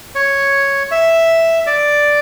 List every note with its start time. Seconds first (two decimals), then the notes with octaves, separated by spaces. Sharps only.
0.15 C#5
0.91 E5
1.67 D5